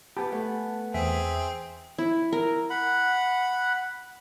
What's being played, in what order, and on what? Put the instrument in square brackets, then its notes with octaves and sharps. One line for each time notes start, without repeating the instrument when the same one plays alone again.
[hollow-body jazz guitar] B3 G4 [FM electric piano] G#5 A5 B5
[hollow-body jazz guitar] A3 B3
[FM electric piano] E2 E5 B6 [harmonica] C4 G#4
[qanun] E4
A#4
[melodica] F#5 B5